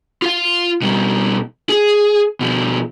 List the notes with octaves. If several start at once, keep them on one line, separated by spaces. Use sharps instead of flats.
F4 F5
B2 G3
G#4
B2 F3